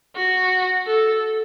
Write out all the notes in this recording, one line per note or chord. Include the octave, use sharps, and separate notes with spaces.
F#4
A4